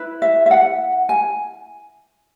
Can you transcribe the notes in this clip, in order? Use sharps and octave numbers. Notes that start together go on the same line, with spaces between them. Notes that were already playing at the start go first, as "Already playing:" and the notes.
Already playing: E4 B4
E5
E5
F#5
G#5